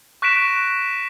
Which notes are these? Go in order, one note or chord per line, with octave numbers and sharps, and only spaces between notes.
C#6 F#6 A#6 B6 D7 E7